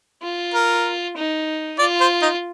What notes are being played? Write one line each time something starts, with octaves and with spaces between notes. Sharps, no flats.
F4
A#4
D#4
F4 D5
C5
D#4